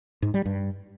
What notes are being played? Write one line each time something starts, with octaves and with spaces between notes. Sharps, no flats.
G#2
G3
G2